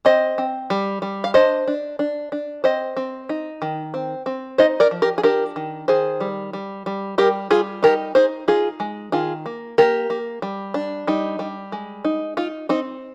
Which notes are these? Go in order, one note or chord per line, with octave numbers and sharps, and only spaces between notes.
C4 C5 D#5
C4
G3
G3
F5
D4 C5 D#5
D4
D4
D4
C4 C5 D#5
C4
D#4
D#3
C4
C4
D#4 C5 D#5
A#4 D5
F3
G4 A#4
G#4
D4 G4 A#4
D#3
D#3 G#4 C5
G3
G3
G3
G3 G4 A#4
G3 F4 G#4
D#4 G4 A#4
D#4 G#4 C5
D#4 F4 G#4
G#3
D#3 F4 G#4
A#3
A#3 G4 A#4
A#3
G3
D4
G3 D#4
G3
G#3
D#4
D#4 F4
C4 D#4